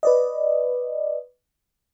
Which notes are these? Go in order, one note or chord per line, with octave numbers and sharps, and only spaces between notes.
B4 D5 D#5